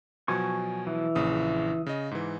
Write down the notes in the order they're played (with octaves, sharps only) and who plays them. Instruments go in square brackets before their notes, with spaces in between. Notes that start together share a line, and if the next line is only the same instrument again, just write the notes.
[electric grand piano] B2 F3 F#3 [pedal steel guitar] G#5 C#6
[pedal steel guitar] E3
[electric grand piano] A#1 C#3 D#6
C#3 D#5
G#2 E3